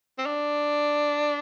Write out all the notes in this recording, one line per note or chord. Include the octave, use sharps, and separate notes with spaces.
C4
D4